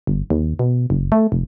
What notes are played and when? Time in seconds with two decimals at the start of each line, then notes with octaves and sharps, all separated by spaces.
0.07 G1
0.30 D#2
0.59 B2
0.90 F#1
1.12 A3
1.32 F1